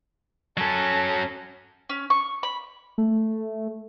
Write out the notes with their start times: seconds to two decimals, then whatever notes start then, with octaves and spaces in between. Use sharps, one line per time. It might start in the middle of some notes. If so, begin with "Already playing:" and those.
0.57 F#3 C#4 A4
1.89 C#4
2.10 C#6
2.43 B5
2.98 A3